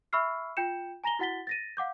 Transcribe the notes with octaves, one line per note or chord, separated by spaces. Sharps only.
E5 B5 C#6 E6 F6 C7
F4 G5 G6 C#7 E7
G#5 A#5 A#6 F7 G7
E4 F#4 F#5 A6 B6 G7
A6 A#6 D#7
F5 F#5 D6 G6